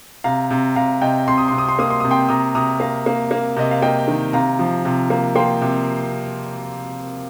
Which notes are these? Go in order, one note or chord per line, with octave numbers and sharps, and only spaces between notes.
C3 F5 A#5
C3
C3 F5 A#5
C3 D#5 G5
C3 C6
D#6
C3 C6
D#6
C6
A#3 D#6
C6
C3 D#6
G5 C6
C3 A#5 D#6
C3 A#5 D#6
A#3 F5 A#5
A#3
A#3
C3 D#5
F5
A#3 D#5 G5
D#3
C3 F5 A#5
F3
C3
A#3
A#3 G5 C6
C3